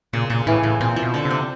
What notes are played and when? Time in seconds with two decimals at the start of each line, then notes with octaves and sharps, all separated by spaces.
0.13 A#2 C#3
0.30 A#2 C#3
0.46 A2 E3
0.63 A2 E3
0.81 A#2 C4
0.96 F3
1.02 B2
1.14 D3
1.25 C3
1.30 C4